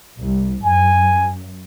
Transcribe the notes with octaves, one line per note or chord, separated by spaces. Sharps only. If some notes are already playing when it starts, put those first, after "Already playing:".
C2
F#2 G#5